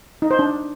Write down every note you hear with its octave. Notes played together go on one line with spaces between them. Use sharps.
D#4
C5
D4